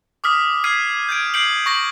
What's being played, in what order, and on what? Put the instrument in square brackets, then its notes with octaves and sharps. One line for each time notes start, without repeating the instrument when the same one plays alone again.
[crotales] D6 D#6 F6 B6
F6 G#6 B6 C7 D#7
G6 G#6 D7
G6 C7 D7 F#7
C#6 A#6 F#7